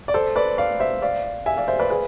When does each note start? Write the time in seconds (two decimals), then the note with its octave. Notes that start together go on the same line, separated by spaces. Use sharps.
0.08 D5
0.14 A4 C5
0.36 B4 D5
0.58 D5 F5
0.80 C5 E5
1.02 D5 F5
1.46 E5 G#5
1.57 D5 F5
1.68 C5 E5
1.79 B4 D5
1.90 G#4 B4